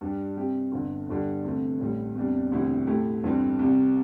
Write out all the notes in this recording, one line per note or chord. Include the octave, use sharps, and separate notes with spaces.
G2 G3 D4 G4
C3 G3 C4 G4
G1 G2 D3
G1 G2 D3 G3 D4
D2 C3 A3
A1 A2 G3
E2 C3 G3 D4
E1 D2 C3 G3 E4
A2 A3 E4 G4
G1 G2 E3 G3 C4
C2 C3 G3